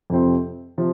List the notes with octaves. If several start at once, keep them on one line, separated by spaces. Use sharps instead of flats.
F2 C3 F3 C4
C3 F3